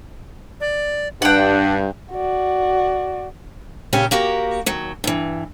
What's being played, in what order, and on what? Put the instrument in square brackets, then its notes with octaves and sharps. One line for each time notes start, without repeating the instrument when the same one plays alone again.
[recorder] D5
[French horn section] G2 [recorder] D4 [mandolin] F#5 G5
[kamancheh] F#4 D5
[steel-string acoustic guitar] A#2 C#3 C#4 G4
A#3 F#4 G4 A#4
D#2 F#3
G2 E3